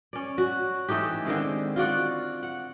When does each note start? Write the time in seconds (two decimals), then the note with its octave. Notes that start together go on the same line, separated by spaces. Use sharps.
0.13 C#4 D5
0.38 F#4
0.88 E3 A3 D#4 G4
1.25 D3 D#3 G#3 C4
1.76 F4 F#4 D5 F#5
2.43 F#5